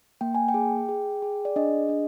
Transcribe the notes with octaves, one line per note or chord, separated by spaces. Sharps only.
A#3 G5
G#5
G5
G#4
G#4
G#4
D5
D4 D#5
D4